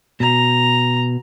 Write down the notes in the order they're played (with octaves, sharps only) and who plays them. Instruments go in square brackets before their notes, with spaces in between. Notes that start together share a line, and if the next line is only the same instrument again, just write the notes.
[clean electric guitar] B2 [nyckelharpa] A#5